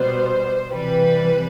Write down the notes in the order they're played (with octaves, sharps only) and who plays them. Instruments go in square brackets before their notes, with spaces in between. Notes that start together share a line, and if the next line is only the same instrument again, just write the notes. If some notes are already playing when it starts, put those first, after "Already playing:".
Already playing: [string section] B2 G3 B3 C5
C3 E3 G3 B4